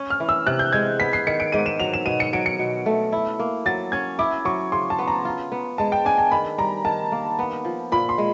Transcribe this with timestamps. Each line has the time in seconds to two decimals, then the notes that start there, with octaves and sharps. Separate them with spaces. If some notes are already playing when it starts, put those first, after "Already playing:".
Already playing: C#4
0.10 F6
0.20 E3
0.29 E6
0.47 C3 F#6
0.59 G6
0.73 G#3 G#6
1.00 B3 B6
1.13 C7
1.27 D#3 C#7
1.40 D7
1.52 G#2 D#7
1.66 E7
1.80 F#3 F7
1.94 E7
2.06 B2 D#7
2.20 C#7
2.33 F#3 D7
2.46 C#7
2.59 B2
2.86 A3
3.12 E4
3.40 A#3
3.66 F#3 A6
3.92 C#4 G#6
4.19 E4 D6
4.45 F#3 C#6
4.72 C#3 C6
4.90 A5
4.99 B3
5.08 A#5
5.25 F4
5.52 B3
5.78 G#3 A5
5.92 G5
6.05 D4 G#5
6.18 G#5
6.31 D#3 B5
6.58 G3 A#5
6.85 D#3 A5
7.12 A#3
7.39 B3
7.65 F3
7.92 A#2 B5
8.09 C6
8.18 G#3